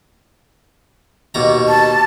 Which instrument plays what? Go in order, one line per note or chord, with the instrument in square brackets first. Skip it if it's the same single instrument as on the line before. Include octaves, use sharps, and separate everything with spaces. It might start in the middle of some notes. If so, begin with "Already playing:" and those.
[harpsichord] D#2 B2 A#5
[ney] A5